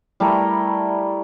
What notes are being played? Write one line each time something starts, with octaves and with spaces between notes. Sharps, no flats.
G3 A3 E4 A#4